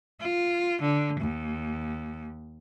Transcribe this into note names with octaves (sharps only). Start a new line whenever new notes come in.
F4
D3
D#2